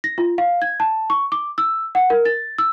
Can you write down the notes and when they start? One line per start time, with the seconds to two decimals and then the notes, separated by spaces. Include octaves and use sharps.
0.04 A#6
0.18 F4
0.38 F5
0.62 G#6
0.80 A5
1.10 C#6
1.32 D6
1.58 E6
1.95 F#5
2.10 A#4
2.25 A6
2.58 E6